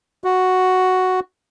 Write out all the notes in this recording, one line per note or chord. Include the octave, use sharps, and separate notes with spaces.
F#4